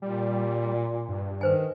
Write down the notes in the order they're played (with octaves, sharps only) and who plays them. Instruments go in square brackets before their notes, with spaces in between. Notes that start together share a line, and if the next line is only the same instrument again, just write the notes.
[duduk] A#2 [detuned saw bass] G3
[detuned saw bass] G2
[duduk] D#3 [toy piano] B4 C5 G#5